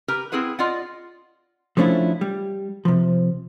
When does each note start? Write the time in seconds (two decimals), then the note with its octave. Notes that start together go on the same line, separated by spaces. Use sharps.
0.08 G4 A#4 B4 A#5
0.32 C4 E4 G#4 B4 F#5
0.59 F4 D5 D#5 F#5
1.77 F3 A3 C#4 D4 E4 F4
2.21 G3
2.85 C3 F3